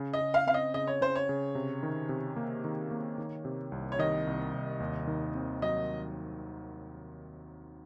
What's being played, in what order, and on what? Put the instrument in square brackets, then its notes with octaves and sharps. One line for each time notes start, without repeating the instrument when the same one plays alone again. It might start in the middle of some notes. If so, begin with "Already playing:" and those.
Already playing: [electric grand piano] C#3
[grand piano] D#5
[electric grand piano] C#3
[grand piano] F5
[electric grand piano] C4 [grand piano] F5
[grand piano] D#5
[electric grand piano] C#3 [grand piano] D#5
[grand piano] C#5
[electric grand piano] C#3 [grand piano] C5
[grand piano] C#5
[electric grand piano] C#3
C3
D#3
C3
A#3
D#3
A#3
D#3
C3
C2
[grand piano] C#5
[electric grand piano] D#3 [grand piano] D#5
[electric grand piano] C2
C2
D#2
D#3
C4
[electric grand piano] F#3 [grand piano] D#5